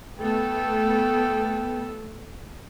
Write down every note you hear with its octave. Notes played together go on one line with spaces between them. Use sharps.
A3 B3 A4 G5